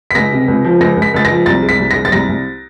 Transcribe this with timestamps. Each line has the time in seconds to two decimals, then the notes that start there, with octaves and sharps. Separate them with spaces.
0.11 B6
0.15 C#2 A#6
0.32 C3
0.48 C#2
0.65 F3
0.80 C#2 A#6
0.97 C#2
1.02 B6
1.14 C#2 A6
1.25 A#6
1.30 F3
1.46 C2 A6
1.63 G#3
1.69 B6
1.79 C2
1.91 G#3 A#6
2.05 A6
2.12 C2 A#6
2.28 C2